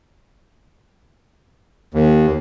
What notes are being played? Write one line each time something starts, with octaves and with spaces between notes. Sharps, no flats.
D#2